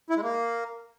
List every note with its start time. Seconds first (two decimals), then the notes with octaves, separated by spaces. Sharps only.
0.10 E4
0.16 G#3
0.23 A#3